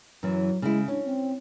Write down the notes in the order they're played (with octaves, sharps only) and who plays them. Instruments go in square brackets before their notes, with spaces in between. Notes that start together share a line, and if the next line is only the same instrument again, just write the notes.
[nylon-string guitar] F#2 E3 [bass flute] F#3
[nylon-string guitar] C#3 E4 [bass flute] G#3
[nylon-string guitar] C#4 [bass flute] D4
[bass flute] C4